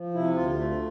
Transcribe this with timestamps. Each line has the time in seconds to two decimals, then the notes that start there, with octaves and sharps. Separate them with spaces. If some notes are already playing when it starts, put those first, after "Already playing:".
Already playing: F3
0.14 C3 E4
0.35 D2 F4
0.56 A3